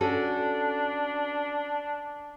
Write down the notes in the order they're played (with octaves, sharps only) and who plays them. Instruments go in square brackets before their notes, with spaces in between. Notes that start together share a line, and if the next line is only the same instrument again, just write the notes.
[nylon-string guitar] C#4 F#4 A4 [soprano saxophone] D4